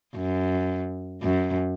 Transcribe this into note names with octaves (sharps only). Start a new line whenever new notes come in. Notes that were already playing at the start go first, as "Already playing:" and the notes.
F#2
F#2